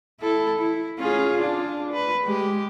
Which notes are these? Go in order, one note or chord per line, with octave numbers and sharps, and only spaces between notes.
E4 A4
E4
C#4 F4 G#4
D4 F4
B4
G#3 G4